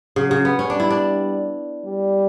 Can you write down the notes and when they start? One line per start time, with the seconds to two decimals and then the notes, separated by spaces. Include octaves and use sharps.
0.16 C#3 F#3
0.31 C#3
0.45 B3
0.59 G3 C#4
0.70 D4
0.80 E4
0.90 D4
1.85 G3